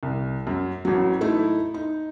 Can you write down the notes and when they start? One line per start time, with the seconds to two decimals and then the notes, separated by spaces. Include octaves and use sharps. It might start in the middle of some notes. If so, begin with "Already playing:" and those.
0.03 C2
0.47 F#2
0.85 A1 F#3
1.21 A3 D#4 E4
1.74 D#4